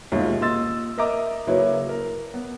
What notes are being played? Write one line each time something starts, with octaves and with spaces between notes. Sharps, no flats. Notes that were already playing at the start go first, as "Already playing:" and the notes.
D#2 B2 G#3 F4 E5
A#2 D#5 C6 E6 A6
A#4 D#5 E5 A#5 D6
C#3 F#3 A#3 E4 B4 C#5
A#4
B3